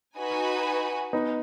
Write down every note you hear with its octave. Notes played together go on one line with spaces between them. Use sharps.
D#4 F#4 B4 G#5
B3 D#4